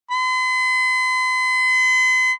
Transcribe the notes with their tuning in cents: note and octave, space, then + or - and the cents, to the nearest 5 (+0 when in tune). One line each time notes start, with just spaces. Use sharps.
C6 -45